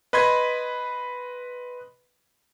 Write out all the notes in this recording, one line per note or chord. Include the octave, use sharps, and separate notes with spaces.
B4 D#5 B5 C6 G#6